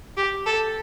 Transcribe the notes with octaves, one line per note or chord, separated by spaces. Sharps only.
G4
A4